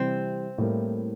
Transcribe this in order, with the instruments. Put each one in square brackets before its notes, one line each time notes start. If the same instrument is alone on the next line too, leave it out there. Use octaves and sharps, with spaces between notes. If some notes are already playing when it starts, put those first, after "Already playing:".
Already playing: [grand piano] C3 E3 G3 [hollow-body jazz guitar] C4
[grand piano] A2 G3 A#3 E4